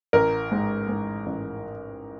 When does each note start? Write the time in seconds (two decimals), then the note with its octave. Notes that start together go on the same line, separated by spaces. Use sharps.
0.13 A1 A#4
0.51 G#2
0.88 G#2
1.26 A1